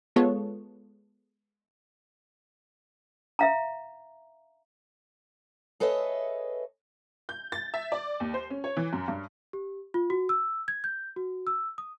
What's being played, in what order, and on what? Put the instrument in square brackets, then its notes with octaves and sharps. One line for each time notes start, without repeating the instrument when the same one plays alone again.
[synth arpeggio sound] G#3 B3 F4 A4 C#5
[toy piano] E5 F5 A#5
[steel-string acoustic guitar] G#4 A4 B4 C#5 D#5 E5
[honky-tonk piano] G6
A6
E5
D5
D#2
C5
C#4
C#5
E3
F#2
G2
[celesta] G4
F4
F#4
E6
G#6
G6
F#4
E6
D#6